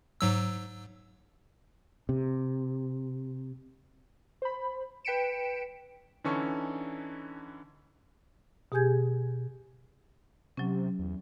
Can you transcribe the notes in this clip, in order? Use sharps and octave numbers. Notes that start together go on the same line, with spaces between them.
G#2 F#3 E6
C3
C5 B5
B4 G5 B6 C#7 D7 E7
D3 E3 C#4 D#4 A4 C#6
B2 G4 G#4 G#5 G6 G#6
C3 F#3 C#4
E2